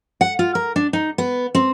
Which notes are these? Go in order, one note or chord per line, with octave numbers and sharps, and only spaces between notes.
F#5
F4
A#4
D4
D#4
B3
C4